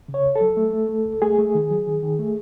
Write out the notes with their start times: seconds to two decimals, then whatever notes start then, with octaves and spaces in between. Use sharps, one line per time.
0.08 C#3
0.14 C#5
0.24 C#2
0.36 A4
0.41 F#3
0.57 A3
0.73 A3
0.89 A3
1.06 C#2
1.22 A3 G#4
1.38 A3
1.55 D#3
1.70 F#3
1.87 D#3
2.03 D#3
2.19 A3